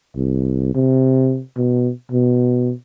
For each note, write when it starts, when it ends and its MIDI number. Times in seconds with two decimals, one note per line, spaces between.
0.16 0.70 36
0.75 1.41 48
1.56 1.91 47
2.11 2.73 47